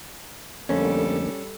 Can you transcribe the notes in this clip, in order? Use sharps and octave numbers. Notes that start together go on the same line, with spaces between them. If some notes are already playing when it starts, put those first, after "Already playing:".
F2 D3 G3 A3 A#3 C#4 A4